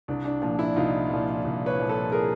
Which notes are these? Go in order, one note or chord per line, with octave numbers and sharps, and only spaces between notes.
C2 D4
D4
A#2 F3
D4 E4
C2 D#4 F4
A#2 F3
C2
B4 C#5
A#2 F3
A4 B4
G#4 A#4